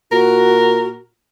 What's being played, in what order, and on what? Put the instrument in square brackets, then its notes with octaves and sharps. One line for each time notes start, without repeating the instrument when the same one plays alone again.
[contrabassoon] A#2 [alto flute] F#4 [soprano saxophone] A#4